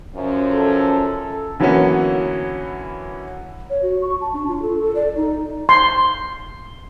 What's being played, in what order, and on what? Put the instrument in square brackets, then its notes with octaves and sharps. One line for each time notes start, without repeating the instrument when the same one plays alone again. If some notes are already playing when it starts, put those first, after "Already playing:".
[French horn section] F#2 F3 C#4
[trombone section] A4
[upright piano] D3 E3 F#3 A#3 B3 C#4
[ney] C#5
F#4
C#6
A5
D4
F4
A4
A4
D5
D#4
[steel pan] C6